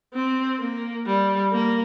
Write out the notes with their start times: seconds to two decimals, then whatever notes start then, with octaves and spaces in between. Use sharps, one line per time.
0.14 C4
0.60 A#3
1.06 G3
1.53 A#3